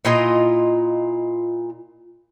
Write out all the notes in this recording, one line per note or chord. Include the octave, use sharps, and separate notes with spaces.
A#2 E4 F4 D#5